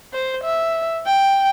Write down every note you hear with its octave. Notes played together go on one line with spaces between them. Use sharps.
C5
E5
G5